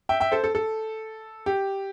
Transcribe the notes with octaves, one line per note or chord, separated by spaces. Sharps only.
E5 G5
E5 G5
A4 C5
A4
A4
G4